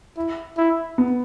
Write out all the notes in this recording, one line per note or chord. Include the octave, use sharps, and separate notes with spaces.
E4
E4
B3